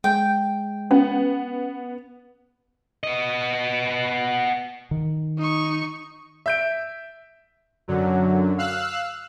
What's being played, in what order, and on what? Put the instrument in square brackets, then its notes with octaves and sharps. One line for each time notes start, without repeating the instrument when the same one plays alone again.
[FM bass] G#3 [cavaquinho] G5
[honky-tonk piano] B3 [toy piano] C#4
[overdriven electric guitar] B3 D#5
[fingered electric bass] D#3
[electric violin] D#4 C#6
[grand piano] E5 G6 D7
[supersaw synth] F#2 D3 F#3
F5 E6 F#6